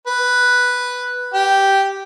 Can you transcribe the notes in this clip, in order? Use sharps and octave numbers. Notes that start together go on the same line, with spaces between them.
B4
G4